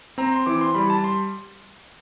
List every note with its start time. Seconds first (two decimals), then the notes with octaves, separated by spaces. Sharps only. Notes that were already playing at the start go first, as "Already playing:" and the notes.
0.18 C4 A#5
0.32 C6
0.46 E3 D6
0.61 C6
0.75 G3 B5
0.90 A5
1.04 C6